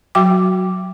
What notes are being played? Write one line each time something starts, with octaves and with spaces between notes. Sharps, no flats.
F#3 F#4 G5 D6